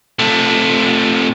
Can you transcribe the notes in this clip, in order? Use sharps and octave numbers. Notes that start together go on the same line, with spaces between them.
C3 A3